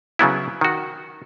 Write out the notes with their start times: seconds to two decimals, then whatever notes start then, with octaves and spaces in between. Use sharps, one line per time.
0.19 C#3 F#3 B3 E4
0.61 D#3 F#4